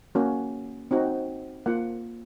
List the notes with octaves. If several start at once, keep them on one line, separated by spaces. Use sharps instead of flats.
A#3 C#4 F#4
C4 D#4 F#4
A#3 F4 F#5